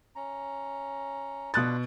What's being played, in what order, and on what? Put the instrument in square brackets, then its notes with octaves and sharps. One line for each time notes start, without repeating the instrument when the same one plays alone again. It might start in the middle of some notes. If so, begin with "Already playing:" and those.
[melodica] C#4 A#5
[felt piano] B2 F#6 A6 [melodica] D4 F4 B4